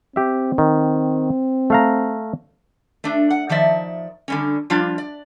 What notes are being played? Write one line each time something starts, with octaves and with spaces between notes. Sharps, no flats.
C4 G4 E5
D#3
A3 F5 A#5
A3 D4
F#5
D#3 F3 D5 E5
D3 G3 C#4
F3 G3 D4 F4
D5